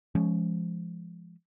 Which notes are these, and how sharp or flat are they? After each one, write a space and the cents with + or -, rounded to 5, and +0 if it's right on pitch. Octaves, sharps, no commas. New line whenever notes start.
F3 -25 G#3 +0 C#4 +0